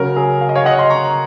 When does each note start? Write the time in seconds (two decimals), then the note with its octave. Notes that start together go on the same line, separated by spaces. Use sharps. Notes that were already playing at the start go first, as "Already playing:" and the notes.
Already playing: C#3 F#3 C#4 A#4
0.17 G#4
0.41 F5
0.49 D#5
0.55 C#5 F5
0.65 D#5 F#5
0.79 C6
0.90 A#5 C#6